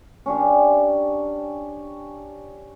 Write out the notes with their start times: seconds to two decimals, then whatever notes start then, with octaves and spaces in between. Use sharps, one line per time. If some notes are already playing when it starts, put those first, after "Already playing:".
0.26 C#4 D4 G4